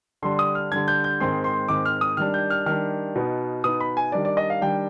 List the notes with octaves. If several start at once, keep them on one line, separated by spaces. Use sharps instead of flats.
D3 G3 D4 C6
D#6
F6
D3 G3 D4 G#6
G6
G6
G#2 D#3 G#3 C4 C6
C6
G#2 D#3 G#3 C4 D6
F6
D#6
D#3 G3 D4 F6
G6
F6
D#3 G3 D4 F6
B2 B3 D#4
B2 B3 D#4 D#6
B5
G#5
D#3 G3 D4 D5
D5
D#5
F5
D#3 G3 D4 G5